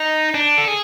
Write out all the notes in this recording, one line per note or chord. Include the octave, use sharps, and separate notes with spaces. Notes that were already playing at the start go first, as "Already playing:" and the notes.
Already playing: D#4
D4
A4
G#4